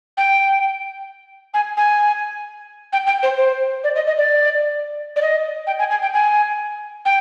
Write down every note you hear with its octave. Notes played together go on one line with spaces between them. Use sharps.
G5
G#5
G#5
G5
G5
C5
C5
D5
D#5
D#5
D5
D5
D#5
G5
G#5
G#5
G5
G#5
G5